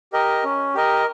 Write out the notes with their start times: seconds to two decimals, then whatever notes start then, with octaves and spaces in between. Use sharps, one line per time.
0.13 G4 A#4 D#5
0.44 C#4
0.74 G4 A#4 D#5